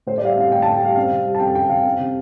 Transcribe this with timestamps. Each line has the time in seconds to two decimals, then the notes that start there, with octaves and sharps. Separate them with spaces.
0.07 A2 C5
0.18 D5
0.22 G3 F5
0.29 E5
0.37 C4 F5
0.51 A2 G5
0.62 A5
0.66 A2
0.74 G5
0.81 G3 F5
0.95 C4 F5
1.11 C3
1.26 G3
1.35 A5
1.40 F2 G5
1.55 C4 G5
1.69 C3 F5
1.85 C4
1.99 C3